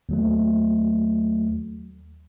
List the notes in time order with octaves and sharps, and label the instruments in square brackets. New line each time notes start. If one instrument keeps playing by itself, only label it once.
[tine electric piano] D#2 F#3 A3